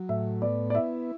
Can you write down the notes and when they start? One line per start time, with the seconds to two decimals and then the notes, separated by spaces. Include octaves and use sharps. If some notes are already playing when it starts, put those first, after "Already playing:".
Already playing: F#3
0.09 A2 E5
0.42 B3 D5
0.70 D5
0.75 E4 E5